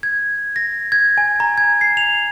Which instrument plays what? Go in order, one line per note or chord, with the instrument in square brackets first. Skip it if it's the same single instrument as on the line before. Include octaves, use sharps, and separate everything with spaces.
[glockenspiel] G#6
A#6
G#6
G#5
A#5
G#6
C7
F7